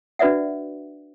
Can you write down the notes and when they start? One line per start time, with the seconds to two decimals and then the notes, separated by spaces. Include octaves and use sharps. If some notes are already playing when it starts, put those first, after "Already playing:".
0.19 D4 F#4 B4 D5 E5 F#5